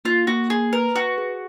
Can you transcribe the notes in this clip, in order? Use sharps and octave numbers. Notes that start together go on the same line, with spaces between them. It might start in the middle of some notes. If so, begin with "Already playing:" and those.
A#3 F4
A#3 F#4
A#3 G#4
A#4 B4
F#4 B4
G#4